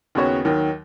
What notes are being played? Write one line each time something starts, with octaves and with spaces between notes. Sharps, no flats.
D#2 C#3 B3 F#4 C#5
D#2 D#3 F#3